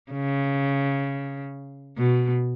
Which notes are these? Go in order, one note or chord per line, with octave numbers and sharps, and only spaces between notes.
C#3
B2